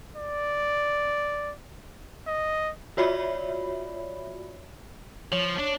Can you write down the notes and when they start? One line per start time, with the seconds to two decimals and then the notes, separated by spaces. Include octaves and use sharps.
0.16 D5
2.27 D#5
2.97 F4 F#4 C#5 D5 E5 B5
5.32 F3 C#5
5.59 D4